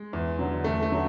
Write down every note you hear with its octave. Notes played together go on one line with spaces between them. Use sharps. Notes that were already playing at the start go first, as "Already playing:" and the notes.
Already playing: G#3
E2
D3 F#3
E2 A3
A3
D3 F#3